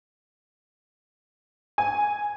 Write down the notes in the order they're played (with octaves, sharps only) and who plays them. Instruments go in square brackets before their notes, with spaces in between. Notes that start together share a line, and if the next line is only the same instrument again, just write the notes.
[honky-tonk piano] G#5